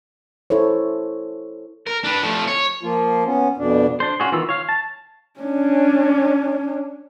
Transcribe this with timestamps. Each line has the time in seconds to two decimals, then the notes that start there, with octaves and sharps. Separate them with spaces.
0.50 E4 A4 C5 C#5
1.87 A#4
2.04 D4 B4
2.22 F3 A3
2.47 C#5
2.83 F3 A#3 F4
3.25 B3 C#4
3.57 F2 B2 D4
4.00 D4 C5
4.20 C#4 F4 F#4 G#4
4.32 D#3 E3 B3 F4 E6
4.49 C#5 F5
4.69 A5
5.40 C#4 D4